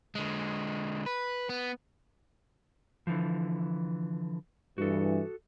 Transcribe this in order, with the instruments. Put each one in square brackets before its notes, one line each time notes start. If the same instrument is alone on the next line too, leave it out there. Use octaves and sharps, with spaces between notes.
[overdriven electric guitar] D3 G#3
B4
B3
[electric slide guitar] D3 E3 F3
[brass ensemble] G2 E3 [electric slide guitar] F#4 A4